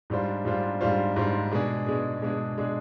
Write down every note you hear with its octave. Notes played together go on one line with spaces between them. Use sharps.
G#2 G3 D4 F4 C5
G#2 G3 D4 F4 C5
G#2 G3 D4 F4 C5
G#2 G3 D4 F4 C5
B2 G#3 D4 G#4
B2 G#3 D4 G#4
B2 G#3 D4 G#4
B2 G#3 D4 G#4